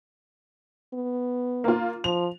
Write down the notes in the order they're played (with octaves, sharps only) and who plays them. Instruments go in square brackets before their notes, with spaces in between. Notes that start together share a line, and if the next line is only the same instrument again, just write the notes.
[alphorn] B3
[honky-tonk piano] A#3 F4
[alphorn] F3 [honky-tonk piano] F7